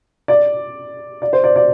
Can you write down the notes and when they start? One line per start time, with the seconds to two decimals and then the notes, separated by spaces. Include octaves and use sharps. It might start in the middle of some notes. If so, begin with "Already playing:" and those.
0.28 D5
1.22 D5
1.33 C5
1.44 D5
1.56 D5